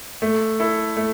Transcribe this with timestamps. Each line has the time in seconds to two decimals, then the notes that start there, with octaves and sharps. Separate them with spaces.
0.22 A3
0.60 E4 A4
0.97 A3